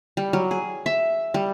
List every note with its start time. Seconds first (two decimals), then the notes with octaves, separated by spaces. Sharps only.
0.17 G3
0.33 F#3
0.51 G#4
0.86 E5
1.34 G3